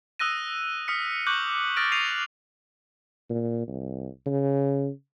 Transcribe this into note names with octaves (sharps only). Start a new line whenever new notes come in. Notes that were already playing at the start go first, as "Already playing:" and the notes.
D#6 E6 F#6 A#6 D#7
D#6 F6 B6 C#7
C#6 D6 F#6 G6 F#7
D#6 F6 A6 A#6 D7
G6 C7 D#7 F7
A#2
C2
C#3